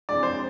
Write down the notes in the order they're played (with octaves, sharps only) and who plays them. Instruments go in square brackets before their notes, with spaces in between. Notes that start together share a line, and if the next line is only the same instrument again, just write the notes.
[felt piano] F2 E3 G#3 D4 [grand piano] D5
[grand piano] C5